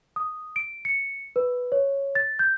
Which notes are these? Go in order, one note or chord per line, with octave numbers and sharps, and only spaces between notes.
D#6
D7
C#7
B4
C#5
A6
G6